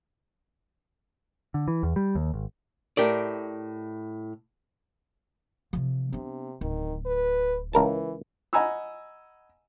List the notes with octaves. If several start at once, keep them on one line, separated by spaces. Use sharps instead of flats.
D3
E3
E2
G3
D#2
G#1
A2 G4 A#4 D5
C3 F3
C3 B3 D4
D1 D#3
B4
C#2 E3 A#4 A5
D#5 F#5 G#5 A#5 B5 E6